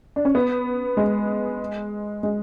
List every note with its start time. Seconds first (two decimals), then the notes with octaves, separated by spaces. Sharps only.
0.16 D4
0.25 C#4
0.35 B3
0.97 G#3
2.23 G#3